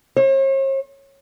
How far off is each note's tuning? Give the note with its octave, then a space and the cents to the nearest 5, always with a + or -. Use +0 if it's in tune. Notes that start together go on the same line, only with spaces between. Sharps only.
C#5 -45